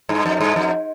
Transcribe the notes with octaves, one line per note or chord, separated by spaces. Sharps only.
G2
F2
G2
F2